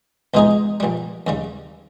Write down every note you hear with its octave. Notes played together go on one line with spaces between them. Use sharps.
C#2 B2 G#3 D#4 G#4
A#1 A#2 G3
D#2 C#3 G3